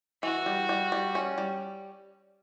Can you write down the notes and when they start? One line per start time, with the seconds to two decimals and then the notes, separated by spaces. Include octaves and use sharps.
0.23 E3 F#4
0.46 G3
0.69 G3
0.92 G3
1.15 C#4
1.38 G3